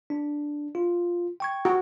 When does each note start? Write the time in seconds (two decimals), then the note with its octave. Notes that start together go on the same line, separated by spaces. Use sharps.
0.10 D4
0.75 F4
1.40 G5 C#6 G#6
1.65 F#4